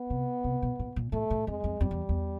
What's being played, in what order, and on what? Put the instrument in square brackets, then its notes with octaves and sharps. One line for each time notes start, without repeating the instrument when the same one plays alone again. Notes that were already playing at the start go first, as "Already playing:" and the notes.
Already playing: [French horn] B3
[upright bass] C3
C3
B2
A#2
A#2
[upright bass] A2 [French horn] A3
[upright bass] A2
[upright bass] F2 [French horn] G#3
[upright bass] F2
[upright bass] F2 [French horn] G3
[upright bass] E2
E2